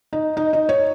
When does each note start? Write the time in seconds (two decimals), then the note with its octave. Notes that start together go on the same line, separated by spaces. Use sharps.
0.13 D#4
0.37 D#4
0.53 D#4
0.69 C#5